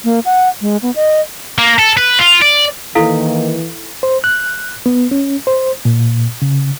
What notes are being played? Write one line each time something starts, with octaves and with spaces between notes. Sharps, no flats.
A#3
F#5
G#3
B3
D#5
A#3
A4
B4
F4
D5
D#3 E3 A#3 E4 A4 F5
C5
F#6
B3
C#4
C5
A#2
C#3